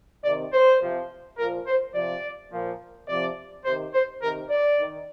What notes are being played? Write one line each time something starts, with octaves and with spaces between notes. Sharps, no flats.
C3 D#3 D5
C5
C3 F3
A#2 F3 A#4
C5
C3 F3 D5
A#2 F3
C3 F3 D5
C3 D#3 C5
C5
C3 D#3 A#4
D5
D#3